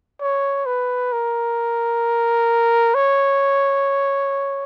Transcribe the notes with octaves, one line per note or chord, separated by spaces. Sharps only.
C#5
B4
A#4
C#5